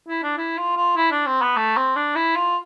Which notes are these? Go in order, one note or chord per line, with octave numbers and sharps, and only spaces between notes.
E4
D4
E4
F4
F4
E4
D4
C4
B3
A3
C4
D4
E4
F4